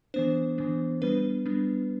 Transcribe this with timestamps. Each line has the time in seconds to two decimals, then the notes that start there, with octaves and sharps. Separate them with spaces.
0.14 E3 B3 D4 C5
0.58 E3 B3 D4
1.02 G3 B3 D4 B4
1.46 G3 B3 D4